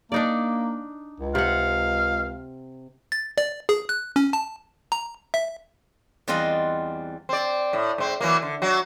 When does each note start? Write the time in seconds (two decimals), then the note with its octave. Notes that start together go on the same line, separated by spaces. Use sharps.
0.12 A#3 D4 D#4 D5
1.20 C#2
1.35 C3 F5 F#5
3.12 A6
3.38 D5
3.69 G#4
3.89 F#6
4.16 C#4
4.33 A5
4.92 A#5
5.34 E5
6.28 E2 G3 C4 F4 D#5 F#5
7.29 C4 D5
7.73 A2
7.98 G#2 C4
8.21 E3 F#3 A#3
8.42 D3
8.62 F#3 F#4